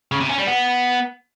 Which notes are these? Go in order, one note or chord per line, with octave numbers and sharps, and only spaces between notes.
C#3
C3
C#4
G3
B3